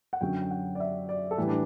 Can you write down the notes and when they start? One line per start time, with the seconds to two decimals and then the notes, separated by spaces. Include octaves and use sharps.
0.13 F#5
0.21 F#2 D3 F#3 G5
0.42 G5
0.51 F#5
0.75 D5
0.80 E5
1.09 D5
1.31 A4
1.38 A2 E3 G3 B4
1.48 D4